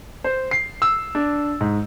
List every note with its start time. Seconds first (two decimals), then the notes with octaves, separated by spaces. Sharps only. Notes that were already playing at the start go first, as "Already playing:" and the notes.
0.24 C5
0.51 C7
0.82 E6
1.15 D4
1.61 G#2